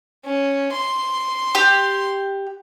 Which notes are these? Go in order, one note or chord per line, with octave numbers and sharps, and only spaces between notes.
C#4
C6
G4